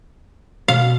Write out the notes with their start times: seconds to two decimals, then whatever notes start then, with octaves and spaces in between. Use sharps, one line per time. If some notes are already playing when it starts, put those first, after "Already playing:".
0.68 B2 F5